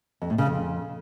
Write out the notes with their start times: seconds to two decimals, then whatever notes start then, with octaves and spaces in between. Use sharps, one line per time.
0.22 F2
0.30 A2
0.38 C#3
0.47 F2